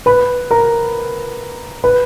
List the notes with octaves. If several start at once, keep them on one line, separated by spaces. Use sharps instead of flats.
B4 B5
A#4 A#5
B4 B5